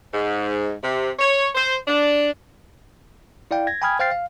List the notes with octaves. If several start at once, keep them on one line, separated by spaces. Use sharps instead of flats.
G#2
C3
C#5
C5
D4
E4 D5 F5 G5
G#6 A#6
G5 G#5 B5 D#6 F6 G#6
C5 F5 G5 F6 A6 C7
F5